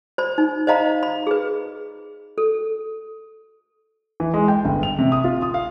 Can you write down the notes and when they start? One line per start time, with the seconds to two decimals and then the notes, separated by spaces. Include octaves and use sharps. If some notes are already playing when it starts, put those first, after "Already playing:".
0.18 C5 B5
0.38 D#4
0.67 C5 D#5 F5 A#5 B5
1.03 B5
1.27 G#4 B4
2.38 A4
4.20 E3
4.34 G#3
4.48 G5
4.65 G1
4.83 F7
4.99 C3
5.12 D#6
5.24 F4
5.42 D#6
5.54 F5